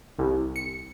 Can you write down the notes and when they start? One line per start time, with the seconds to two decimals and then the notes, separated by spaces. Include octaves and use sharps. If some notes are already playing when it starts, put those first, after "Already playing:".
0.19 C2
0.56 C#7